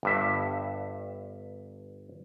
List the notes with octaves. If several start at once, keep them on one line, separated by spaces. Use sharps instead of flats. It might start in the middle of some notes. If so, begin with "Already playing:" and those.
G1 G2 E5